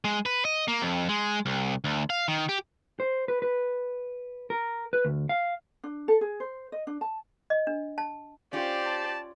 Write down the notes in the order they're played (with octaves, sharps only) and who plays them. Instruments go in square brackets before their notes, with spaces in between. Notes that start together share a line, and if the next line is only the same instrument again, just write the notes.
[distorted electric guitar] G#3
B4
D#5
A#3
F2
G#3
C2
D2
F5
D#3
G4
[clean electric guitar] C5
B4
B4
A#4
B4
D2
F5
[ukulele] D4
A4
G#4
C5
D#5
D4
A5
[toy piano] D#5
D4
A5
[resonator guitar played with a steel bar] C#4 F4 [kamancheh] G4 C5 [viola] D5
[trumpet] A5